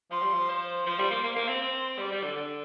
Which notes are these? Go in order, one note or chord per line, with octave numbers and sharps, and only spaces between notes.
F3 C6
G3
F3
C5
F3 C5
G3
A#3
A#3 C5
A#3
C4
C4
G3 D5
G3
D3
D3